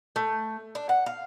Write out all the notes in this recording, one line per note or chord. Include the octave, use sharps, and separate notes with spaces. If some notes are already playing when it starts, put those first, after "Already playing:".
A3
D4
F#5
F5